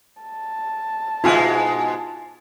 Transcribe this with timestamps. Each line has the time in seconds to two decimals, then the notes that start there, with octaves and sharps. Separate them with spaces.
0.22 A5
1.24 G#2 B2 G#3 E4 F4 G#5